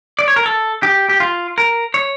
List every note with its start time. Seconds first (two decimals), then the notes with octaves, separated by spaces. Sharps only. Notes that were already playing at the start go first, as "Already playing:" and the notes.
0.19 D5
0.28 C#5
0.36 A#4
0.46 A4
0.83 G4
1.09 G4
1.20 F4
1.58 A#4
1.94 C#5